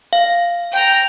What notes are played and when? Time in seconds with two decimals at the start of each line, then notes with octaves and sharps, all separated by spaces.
0.13 F5
0.72 G5 A#5